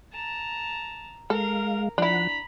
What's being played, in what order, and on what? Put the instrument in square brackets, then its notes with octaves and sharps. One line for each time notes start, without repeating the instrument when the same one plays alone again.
[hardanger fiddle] A5 A#5
[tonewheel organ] G#3 F5 [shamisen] A4 [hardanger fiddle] A#4
[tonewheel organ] F3 F#5 [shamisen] D4 E4 [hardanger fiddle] A#5 B5